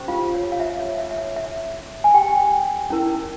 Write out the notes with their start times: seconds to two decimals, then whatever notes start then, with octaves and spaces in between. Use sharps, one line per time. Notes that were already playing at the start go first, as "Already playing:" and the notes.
Already playing: C#4 G4 C5
0.08 F4 F5
0.34 C#5
0.52 F5
0.60 E5
0.79 C#5
0.98 E5
1.11 E5
1.18 C#5
1.36 E5
2.04 G#5
2.14 G4 G5
2.90 C#4 E4 A#4